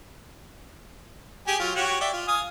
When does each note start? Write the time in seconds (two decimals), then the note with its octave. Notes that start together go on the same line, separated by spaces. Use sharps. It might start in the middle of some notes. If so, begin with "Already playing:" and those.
1.47 G4 G#4 G#5
1.60 F#3 F4
1.76 F#4 G4 C#5
2.01 D5 E5 G5
2.13 F4
2.28 F5 G#5 D#6